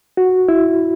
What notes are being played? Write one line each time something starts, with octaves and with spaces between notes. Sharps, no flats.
F#4
E4